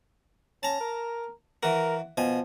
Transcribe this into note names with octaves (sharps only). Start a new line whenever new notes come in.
C#4 A5 A#5
A#4
E3 F#4 A#4
B2 F3 G#5